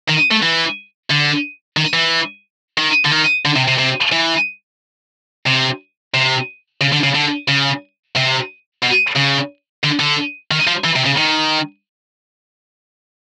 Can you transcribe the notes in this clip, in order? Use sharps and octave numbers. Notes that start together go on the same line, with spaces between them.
D#3
A3
E3
D3
D#3
E3
D#3
D3
D#3
D3
C3
C3
C3
E3
C3
C3
C#3
D3
C#3
D3
C#3
C3
B2
C#3
D3
D3
D#3
F3
E3
C3
C#3
D#3